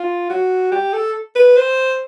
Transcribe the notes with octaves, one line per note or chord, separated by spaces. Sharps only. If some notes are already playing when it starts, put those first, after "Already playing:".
Already playing: F4
F#4
G4
A4
B4
C5